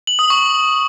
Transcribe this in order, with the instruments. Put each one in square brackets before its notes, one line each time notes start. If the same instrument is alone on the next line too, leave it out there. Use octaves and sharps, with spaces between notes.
[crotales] F#7
D#6
C#6